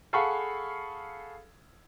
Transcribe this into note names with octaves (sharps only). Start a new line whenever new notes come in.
G#4 A4 F5 F#5 B5 C#6